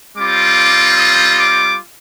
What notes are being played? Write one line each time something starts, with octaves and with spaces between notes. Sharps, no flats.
G3 C4 F4 D6
D#6
D6